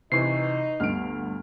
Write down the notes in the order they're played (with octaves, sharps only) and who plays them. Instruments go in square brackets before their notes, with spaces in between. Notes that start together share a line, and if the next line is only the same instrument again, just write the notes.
[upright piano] C3 E3 [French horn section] D#4 [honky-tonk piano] B4 C#6 [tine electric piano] C7
[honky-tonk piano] G1 D2 G2 [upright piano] F6 D7